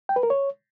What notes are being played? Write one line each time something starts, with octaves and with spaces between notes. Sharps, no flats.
G5
B4
A#4
C#5